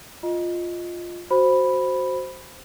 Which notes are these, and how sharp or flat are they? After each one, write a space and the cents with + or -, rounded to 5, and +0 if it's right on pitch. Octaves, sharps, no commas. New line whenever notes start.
F4 +0 D#5 +0
F#4 +5 C5 +0 B5 +0